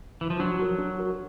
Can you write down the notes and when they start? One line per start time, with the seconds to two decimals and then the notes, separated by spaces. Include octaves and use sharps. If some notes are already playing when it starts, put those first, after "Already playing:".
0.21 E3
0.30 F3
0.39 F#3 D4
0.59 F#4 A#4
0.78 D4
0.98 F#4 A#4